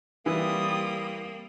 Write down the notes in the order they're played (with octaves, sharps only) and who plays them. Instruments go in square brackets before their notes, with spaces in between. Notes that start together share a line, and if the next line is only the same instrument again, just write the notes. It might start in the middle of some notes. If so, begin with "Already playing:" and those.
[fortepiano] E3 E4 [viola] G3 C4 [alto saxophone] A#3 [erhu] D#6